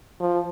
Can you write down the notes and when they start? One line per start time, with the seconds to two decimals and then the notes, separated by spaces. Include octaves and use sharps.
0.20 F3